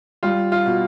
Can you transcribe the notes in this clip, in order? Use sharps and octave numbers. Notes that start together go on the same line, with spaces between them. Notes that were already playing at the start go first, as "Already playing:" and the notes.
G3 F4
F4
B2